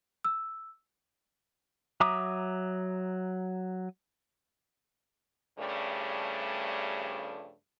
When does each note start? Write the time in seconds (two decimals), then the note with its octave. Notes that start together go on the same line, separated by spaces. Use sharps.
0.24 E6
2.00 F#3 E5 A#5 D6 D#6
5.59 G2 C#3 F3 G3 A3